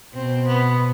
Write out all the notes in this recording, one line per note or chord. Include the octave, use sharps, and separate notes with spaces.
B2 C4
B3